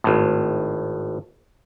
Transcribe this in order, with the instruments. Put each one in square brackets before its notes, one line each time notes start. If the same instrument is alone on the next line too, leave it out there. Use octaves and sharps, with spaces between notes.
[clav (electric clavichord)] G#1 A2